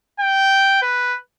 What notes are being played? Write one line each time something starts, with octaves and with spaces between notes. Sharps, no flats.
G5
B4